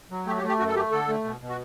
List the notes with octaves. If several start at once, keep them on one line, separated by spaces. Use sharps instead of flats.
F#3
A3 G4
G4
A3
G4
F#2 F#4
A4
A3 G4
D3 A4
A3
B2
B2
F#4